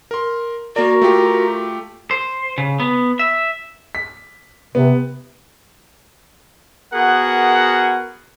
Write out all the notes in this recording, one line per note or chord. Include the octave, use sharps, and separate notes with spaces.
A#4 C6
A#3 F#4 A#4 D5
A3 F4 G4
C5
C#3
B3
E5
B6
C3 B3
B3 F#4 G#4 A#4 F#5